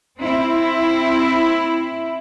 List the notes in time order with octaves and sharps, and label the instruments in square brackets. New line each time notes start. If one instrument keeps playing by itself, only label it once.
[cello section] C4 E4